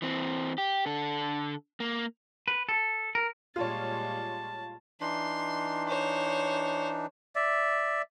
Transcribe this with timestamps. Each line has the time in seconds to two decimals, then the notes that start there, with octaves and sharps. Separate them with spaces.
0.02 E3 C4
0.58 G4
0.86 D3 A4
1.80 A#3
2.48 B4
2.69 A4
3.15 A#4
3.56 A#2 G3 G#3 F4 C#5 A5
5.01 E3 D4 D#4 C6
5.88 C5 C#5
7.35 D5 E5